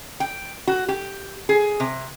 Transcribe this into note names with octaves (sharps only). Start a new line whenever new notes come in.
G5
F#4
G4
G#4
C3